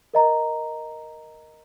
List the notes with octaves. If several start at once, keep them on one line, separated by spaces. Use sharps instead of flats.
A#4 D#5 A#5